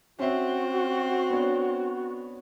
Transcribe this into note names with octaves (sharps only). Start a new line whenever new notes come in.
C4 C#4 F#4 E5
B3 D4 C#5